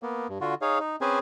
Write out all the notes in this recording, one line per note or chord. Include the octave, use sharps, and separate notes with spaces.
A#3 B3
G2
D3 F4 F#4
D#4 G#4 C#5 F5
D#4
C4 C#4 G#4 B4 C5 G#5